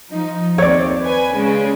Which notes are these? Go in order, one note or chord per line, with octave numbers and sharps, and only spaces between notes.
F3 D#4
D#2 C4 C#5 D5
B4 G#5
C#3 G#3